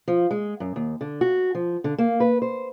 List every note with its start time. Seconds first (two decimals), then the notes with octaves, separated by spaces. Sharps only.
0.08 F3
0.31 G#3
0.60 F#2
0.76 D#2
1.01 D3
1.21 F#4
1.55 F3
1.84 D3
1.98 A#3
2.20 B4
2.42 C5